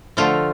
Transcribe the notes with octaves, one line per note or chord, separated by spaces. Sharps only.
D3 F3 A3 F4